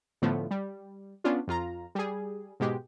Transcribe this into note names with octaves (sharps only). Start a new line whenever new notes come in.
A2 D3 F3 A3 B3
G3
B3 C#4 D4 F4
F2 F4 A#5
G3 G#4
G#2 B2 G#3 G4